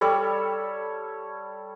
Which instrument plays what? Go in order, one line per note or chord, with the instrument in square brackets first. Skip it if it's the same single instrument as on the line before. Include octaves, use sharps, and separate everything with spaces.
[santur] G3 A4 C#5 B5